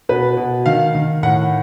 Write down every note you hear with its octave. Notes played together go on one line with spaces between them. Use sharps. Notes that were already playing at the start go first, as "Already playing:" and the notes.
B2 B4
B2
D#3 F5
D#3
A2 F#5